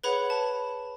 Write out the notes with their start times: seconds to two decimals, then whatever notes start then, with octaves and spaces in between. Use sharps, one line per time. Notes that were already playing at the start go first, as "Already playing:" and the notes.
0.04 G#4 B4 C#5 F#5 B5
0.30 A5